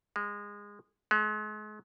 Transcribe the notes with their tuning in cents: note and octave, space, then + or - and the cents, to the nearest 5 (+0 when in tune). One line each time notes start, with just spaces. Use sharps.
G#3 -20
G#3 +40